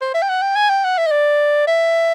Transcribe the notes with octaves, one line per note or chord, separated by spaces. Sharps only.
C5
E5
G5
F#5
G5
G#5
G5
F#5
E5
D#5
D5
E5